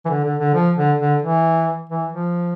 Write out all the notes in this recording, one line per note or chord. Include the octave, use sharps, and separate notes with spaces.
E3
D3
D3
D3
F3
D3
D3
E3
E3
F3